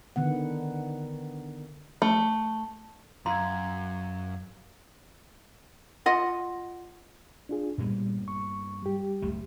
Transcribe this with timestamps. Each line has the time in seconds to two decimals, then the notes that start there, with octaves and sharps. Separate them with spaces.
0.16 D3 D#3 B3 F#5
2.02 A3
3.26 F#2 F5 A#5 C6 G#6
6.06 F4 D#5 F#5
7.49 D4 F4 G#4
7.78 G2 A#2 G3 A#3 B3
8.28 C#6
8.82 G3 G4
9.22 F#1 C#2 A3